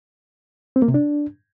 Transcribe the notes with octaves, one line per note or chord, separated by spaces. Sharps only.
C4
A#3
C3
D4